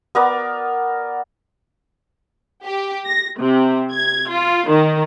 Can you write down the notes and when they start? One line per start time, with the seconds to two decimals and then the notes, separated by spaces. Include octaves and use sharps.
0.15 B3 A#4 D5
2.65 G4
3.06 A#6
3.39 C3
3.91 G#6
4.29 F4
4.67 D#3